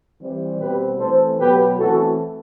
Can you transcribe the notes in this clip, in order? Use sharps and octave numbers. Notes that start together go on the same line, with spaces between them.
E3 G3 C4
B2 G3 C4 G4 B4
E3 A3 C4 A4 C5
B2 F#3 B3 G4 B4
E3 A3 C4 F#4 A4